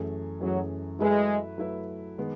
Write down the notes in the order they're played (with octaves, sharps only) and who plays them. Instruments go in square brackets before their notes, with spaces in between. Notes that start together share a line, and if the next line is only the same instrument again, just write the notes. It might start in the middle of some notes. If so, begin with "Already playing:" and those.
Already playing: [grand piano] F#2 E3 A3 C#4 G#4
[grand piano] F#2 E3 A3 C#4 G#4 [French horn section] F#3
[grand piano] F#3 A3 E4 B4 E5 [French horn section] G#3
[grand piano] F#3 A3 E4 B4 E5
D#3 G#3 B3